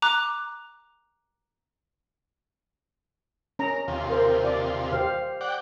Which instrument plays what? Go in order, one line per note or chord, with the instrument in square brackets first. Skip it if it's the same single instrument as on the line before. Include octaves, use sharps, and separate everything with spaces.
[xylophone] A#5 D6 F#6
[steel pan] C#4 A#5 [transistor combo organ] A#4
[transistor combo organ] D#2 C3 F4
[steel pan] A#4 C5
D5
G4 C5 F5
[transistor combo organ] D5 F#5 G5